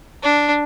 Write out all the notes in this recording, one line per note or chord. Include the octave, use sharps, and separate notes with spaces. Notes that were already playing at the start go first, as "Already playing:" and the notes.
D4